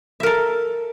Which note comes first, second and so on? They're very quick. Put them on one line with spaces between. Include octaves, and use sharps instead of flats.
E5 A#4 A4